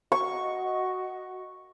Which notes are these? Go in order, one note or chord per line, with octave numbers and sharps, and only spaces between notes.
F#4 D#5 C#6